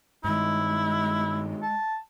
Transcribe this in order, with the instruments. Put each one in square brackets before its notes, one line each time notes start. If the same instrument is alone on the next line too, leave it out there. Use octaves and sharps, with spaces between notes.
[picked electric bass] G2 D#3 [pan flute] G#3 [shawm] E4
[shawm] A5